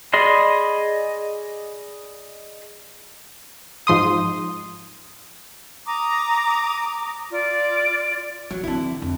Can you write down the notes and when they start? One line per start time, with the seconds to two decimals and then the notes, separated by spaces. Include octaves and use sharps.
0.13 G#4 D5 D#5 B5 C6
3.87 G#2 F3 C6 D#6
5.86 A#5 D6 D#6
7.32 F4 D5
8.51 F3 F#3
8.63 D3 E3 C4 E4
9.02 F2